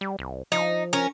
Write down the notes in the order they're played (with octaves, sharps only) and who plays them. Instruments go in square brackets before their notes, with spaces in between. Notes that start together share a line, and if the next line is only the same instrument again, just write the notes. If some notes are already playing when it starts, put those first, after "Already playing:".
[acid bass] G3
C2
[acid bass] F3 [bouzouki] D#4
[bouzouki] C#4 A#4